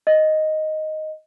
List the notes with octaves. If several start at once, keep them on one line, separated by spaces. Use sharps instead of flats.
D#5